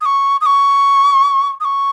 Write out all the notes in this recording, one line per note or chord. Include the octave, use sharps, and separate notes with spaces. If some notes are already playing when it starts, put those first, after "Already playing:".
D#6
C#6
D#6
C#6
D#6
C#6